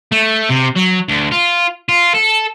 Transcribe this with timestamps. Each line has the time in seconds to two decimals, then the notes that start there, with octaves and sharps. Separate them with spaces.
0.12 A3
0.49 C3
0.76 F#3
1.08 D2
1.31 F4
1.89 F4
2.14 A4